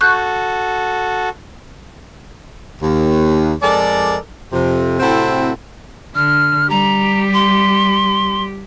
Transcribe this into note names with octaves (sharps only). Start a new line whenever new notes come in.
F#4 A4 C#6 F#6 G6
D#2
F2 G#3 A4 A#4 D5
F2 C3
A2 C3 C4 E4 F#4 A4
D3 F6
G3 G4 A#5
C6